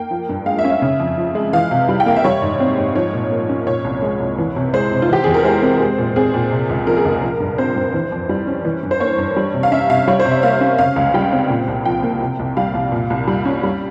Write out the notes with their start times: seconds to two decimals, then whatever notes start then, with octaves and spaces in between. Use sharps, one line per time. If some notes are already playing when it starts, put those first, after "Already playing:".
Already playing: A#3 G5
0.11 F3
0.29 G2
0.46 G#3 F5
0.59 E5
0.65 C#4
0.70 E5
0.82 C#3
1.00 F2
1.18 F3
1.35 G#3
1.53 E3 F5
1.71 C3
1.89 G3
2.00 G5
2.06 A#3 F5
2.16 E5
2.24 G3 C#5
2.42 G#2
2.60 C4
2.78 G#2
2.95 F3 C#5
3.13 A#2
3.31 A#3
3.49 C#4
3.67 A#2 C#5
3.84 C2
4.02 G#3
4.20 C2
4.38 E3
4.56 C3
4.74 G#3 C5
4.91 C3
5.02 F4
5.09 E3 G4
5.24 E2 G#4
5.34 A#4
5.45 G#3 C5
5.63 C4
5.80 G#3
5.98 A#2
6.16 C4 G#4
6.34 A#2
6.51 C3
6.69 C#2
6.87 F3 A#4
6.97 G#4
7.05 C#2 A#4
7.23 F3
7.40 G2
7.58 C4 C5
7.76 G2
7.94 E3
8.12 F2
8.29 G3
8.47 C#4
8.65 E3
8.83 G2
8.91 C5
9.00 A#3 C#5
9.18 G2
9.36 G3
9.54 C3
9.63 F5
9.72 C#4 E5
9.89 C3 F5
10.08 G3 C#5
10.20 C5
10.25 C3
10.31 E5
10.43 A#3 F5
10.61 C#4
10.78 C#3 F5
10.96 C#2
11.14 G3 G5
11.32 C4
11.49 A#2
11.68 C2
11.85 F3 G5
12.03 A#3
12.21 C3
12.39 C2
12.57 G3 F5
12.74 C2
12.92 A#2
13.10 C2
13.28 G3
13.45 C#4
13.63 G3